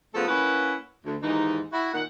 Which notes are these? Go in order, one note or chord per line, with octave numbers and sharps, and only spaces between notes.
C#3 F3 A3 B3 A4
A#3 C#4 E4 B4 F#5
D2
D#2 G#2 E3 D#4
E4 F#4
A#2 D#3 F#5